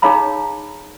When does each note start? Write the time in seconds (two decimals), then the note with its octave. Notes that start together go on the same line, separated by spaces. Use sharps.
0.02 D#4 G#4 C#5 F5 A#5 B5